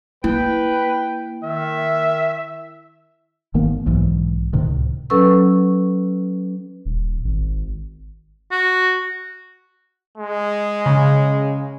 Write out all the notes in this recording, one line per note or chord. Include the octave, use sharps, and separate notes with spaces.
A#3 E4 B4 G5
D#3 E5
G1 D#3 A#3 B3
B1 G#2 E3
C#2 A2 C3 D#3
F#3 C#4 A4 B4 C#6 E6
D#1
G#1
F#4
G#3
C#3